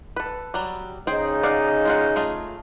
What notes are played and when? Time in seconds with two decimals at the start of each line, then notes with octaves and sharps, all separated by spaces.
0.16 A4 B4
0.54 F#3 G3
1.07 C#3 D#4 G#4 C5 G5
1.43 D5 F5 F#5
1.85 G#3 F4 F#5
2.16 A3 F4 G#4